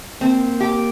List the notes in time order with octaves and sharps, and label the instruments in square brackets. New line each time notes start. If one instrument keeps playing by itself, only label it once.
[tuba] A#3 [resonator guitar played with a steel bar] C4
[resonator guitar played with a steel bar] G4